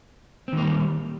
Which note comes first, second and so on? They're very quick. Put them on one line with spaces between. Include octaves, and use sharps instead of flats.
C4 D#3 A#3 G3